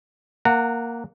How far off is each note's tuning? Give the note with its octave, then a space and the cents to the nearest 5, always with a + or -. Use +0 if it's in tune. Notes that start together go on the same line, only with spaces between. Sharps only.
A#3 +0 F#5 +0 A#5 -30